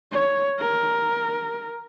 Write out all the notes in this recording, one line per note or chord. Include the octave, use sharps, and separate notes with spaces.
C#5
A#4